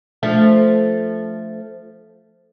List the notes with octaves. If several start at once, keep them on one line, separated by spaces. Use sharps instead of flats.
F3 A3 D4